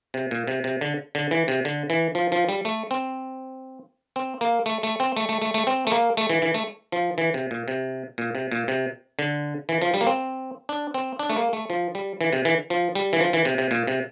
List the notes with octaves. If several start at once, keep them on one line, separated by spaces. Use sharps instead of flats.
C3
A#2
C3
C3
D3
D3
E3
C3
D3
E3
F3
F3
G3
A3
C4
C4
A#3
A3
A3
C4
A3
A3
A3
A3
C4
A3
A#3
A3
E3
E3
A3
F3
E3
C3
A#2
C3
A#2
C3
A#2
C3
D3
E3
F3
G3
A#3
C4
D4
C4
D4
A3
A#3
A3
F3
G3
E3
C3
E3
F3
G3
E3
F3
E3
C3
C3
A#2
C3